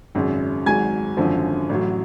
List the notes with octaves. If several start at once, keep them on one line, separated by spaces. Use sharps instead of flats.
G#1 F#2 C#3
G#1 G#2 F#3 G#5 G#6
G#1 F#2 D3 F3
A1 A2 F#3